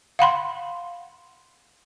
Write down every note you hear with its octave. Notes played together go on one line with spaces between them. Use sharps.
F5 F#5 B5 C6